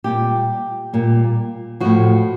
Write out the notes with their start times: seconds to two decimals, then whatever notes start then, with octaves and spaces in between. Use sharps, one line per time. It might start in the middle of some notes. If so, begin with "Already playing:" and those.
0.04 A#2 G3 G4
0.93 A#2 G3
1.80 A2 F3 F#4